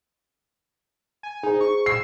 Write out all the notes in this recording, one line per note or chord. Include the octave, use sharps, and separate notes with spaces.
G#5
D#4 G#4 C5
C#6
E6 C7